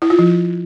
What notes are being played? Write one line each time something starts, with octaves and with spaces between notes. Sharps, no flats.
E4
F4
F3